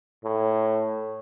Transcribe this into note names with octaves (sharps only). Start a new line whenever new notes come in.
A2